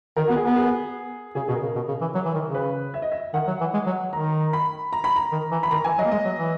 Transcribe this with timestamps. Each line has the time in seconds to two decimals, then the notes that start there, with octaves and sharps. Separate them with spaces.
0.17 D#3 A#4
0.27 B3 F#4
0.36 G#4
0.43 B3 A#4
0.56 G#4
1.35 C#3 G#4
1.48 B2 G#4
1.55 A#4
1.62 C#3
1.75 B2
1.88 C#3
2.01 E3
2.15 F#3
2.25 E3
2.35 D#3
2.45 C#3
2.55 B4
2.94 E5
3.02 D#5
3.12 E5
3.34 D#3 F#5
3.47 F#3
3.61 E3
3.74 G#3
3.87 F#3
4.13 D#3 A#5
4.53 B5
4.93 A#5
5.04 B5
5.16 A#5
5.32 D#3
5.51 E3
5.63 B5
5.71 D#3 A#5
5.84 E3 G#5
5.98 F#3 D#5
6.05 A#3
6.11 G#3 D#5
6.25 F#3
6.37 E3